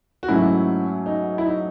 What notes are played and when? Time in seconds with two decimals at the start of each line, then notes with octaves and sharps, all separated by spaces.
0.23 F#4
0.28 G#2 F#3 A3 C#4 E4
1.06 D#4
1.38 E4
1.45 D#4